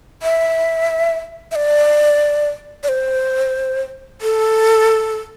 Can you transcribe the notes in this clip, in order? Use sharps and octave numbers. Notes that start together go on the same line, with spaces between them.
E5
E5
D5
D5
C5
A4